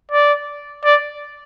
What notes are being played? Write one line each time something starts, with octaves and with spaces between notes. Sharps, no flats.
D5
D5